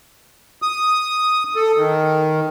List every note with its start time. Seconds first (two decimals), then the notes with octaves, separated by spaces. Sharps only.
0.62 D#6
1.56 A4
1.76 D#3